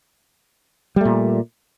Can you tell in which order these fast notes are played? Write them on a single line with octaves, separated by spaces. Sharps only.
G3 A3 A#2